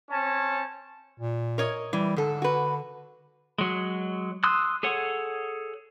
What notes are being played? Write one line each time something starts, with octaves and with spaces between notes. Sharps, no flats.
C4 C#4 C#5 A5
A#2
A#4 C#5 D#5
E3 G3
G#2 D3 A4
F#4 B4
F#3 G#3
C6 D#6 E6 F#6
G#4 A4 C#5 F#5